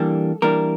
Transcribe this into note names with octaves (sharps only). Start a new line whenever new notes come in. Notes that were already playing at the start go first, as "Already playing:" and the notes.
Already playing: E3 G3 A#3 D4 A4
E3 G3 A#3 D4 A#4